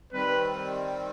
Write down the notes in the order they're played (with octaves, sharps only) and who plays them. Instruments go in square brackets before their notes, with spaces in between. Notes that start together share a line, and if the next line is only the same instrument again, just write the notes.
[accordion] D#3 G3 C4 [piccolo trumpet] B4